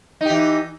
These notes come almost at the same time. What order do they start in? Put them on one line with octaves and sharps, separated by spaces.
D#4 G4 E3